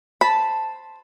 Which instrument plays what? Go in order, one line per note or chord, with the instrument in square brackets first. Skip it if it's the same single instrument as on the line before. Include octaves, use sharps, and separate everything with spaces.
[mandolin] C5 A5 [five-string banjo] B5